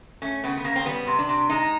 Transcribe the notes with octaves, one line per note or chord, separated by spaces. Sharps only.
A3 C#4
C#3 B3
B3
C#3 A#3
C4
G3 B3
C3
D4
C3
G#3 D#4